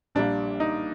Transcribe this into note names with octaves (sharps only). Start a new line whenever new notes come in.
A#1 A#2 G3 A#3 D4
D#4